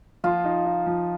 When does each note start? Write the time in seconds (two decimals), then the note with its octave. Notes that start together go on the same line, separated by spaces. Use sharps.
0.24 F3 F4
0.45 D#4
0.66 D#4
0.86 F3